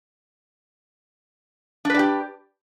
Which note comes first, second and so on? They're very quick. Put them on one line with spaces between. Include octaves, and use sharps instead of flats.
D4 B4 D5 G4